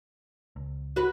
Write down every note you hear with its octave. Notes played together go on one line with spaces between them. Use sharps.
C#2
F#4 B4